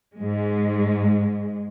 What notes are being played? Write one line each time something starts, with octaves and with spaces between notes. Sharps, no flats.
G#2 G#3